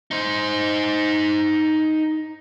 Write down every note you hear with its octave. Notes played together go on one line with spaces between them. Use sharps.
D#4 C5